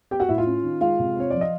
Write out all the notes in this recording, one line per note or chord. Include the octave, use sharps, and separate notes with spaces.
B3 G4 G5
F#4 F#5
A2 E4 E5
F4 F5
C#4
D#3
G#3 F4 F5
C3
C4 C#5
F3 D5
D#5